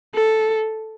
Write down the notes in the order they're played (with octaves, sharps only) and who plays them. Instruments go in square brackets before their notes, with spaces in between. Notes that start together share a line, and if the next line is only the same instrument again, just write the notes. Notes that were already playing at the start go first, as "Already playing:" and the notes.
[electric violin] A4